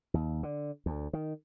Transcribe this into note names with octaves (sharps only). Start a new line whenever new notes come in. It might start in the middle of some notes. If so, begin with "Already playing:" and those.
D#2
D3
D2
D#3